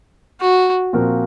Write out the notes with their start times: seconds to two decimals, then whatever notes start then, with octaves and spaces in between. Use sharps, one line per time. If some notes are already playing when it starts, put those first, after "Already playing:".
0.40 F#4
0.93 A#2 F3 C4 F#4 A#4